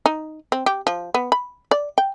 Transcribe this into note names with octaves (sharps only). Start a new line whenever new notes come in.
D#4
C4
G4
F3
B3
B5
D5
G5